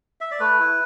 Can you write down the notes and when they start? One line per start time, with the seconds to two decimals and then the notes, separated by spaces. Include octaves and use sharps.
0.21 E5
0.31 D5
0.40 A3 B4
0.59 E4